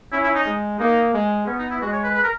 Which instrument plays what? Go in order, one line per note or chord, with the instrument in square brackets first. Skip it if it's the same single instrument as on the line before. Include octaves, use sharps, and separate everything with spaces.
[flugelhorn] C#4 [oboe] E4
[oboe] E4
D#4
[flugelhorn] G#3
[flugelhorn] A#3 [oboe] D#4
[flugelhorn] G#3
[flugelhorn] B3 [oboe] C#4
[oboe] D#4
E4
[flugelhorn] G#3 [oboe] F#4
[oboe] C#5
B4
B4
A#4